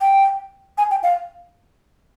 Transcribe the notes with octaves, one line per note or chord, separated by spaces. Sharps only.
G5
G#5
G5
F5